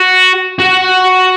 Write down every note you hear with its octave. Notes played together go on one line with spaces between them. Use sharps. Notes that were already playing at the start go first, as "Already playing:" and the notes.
Already playing: F#4
F#4